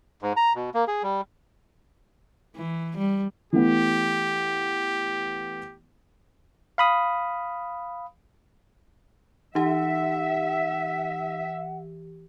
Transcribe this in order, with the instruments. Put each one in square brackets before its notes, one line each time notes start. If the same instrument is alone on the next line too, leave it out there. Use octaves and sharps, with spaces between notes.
[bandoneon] G#2
A#5
B2
A#3
G#4
G3
[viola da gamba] E3
G3
[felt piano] E3 A3 B3 [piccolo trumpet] G4
[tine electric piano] F5 B5 D#6
[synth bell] E3 G4 [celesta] D#4 [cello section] E5 [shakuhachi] F#5